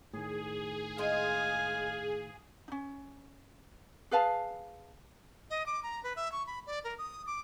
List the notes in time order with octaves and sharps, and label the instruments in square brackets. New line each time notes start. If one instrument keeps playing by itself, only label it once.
[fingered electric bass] A2 D#3 [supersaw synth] G#4
[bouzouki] G#3 D#4 D#5 [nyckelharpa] F5 G#5
[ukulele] C#4 D#4
G#4 B4 F5 A5
[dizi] D#5
D6
A#5
B4
E5
C#6
B5
D5
A#4
D#6
D6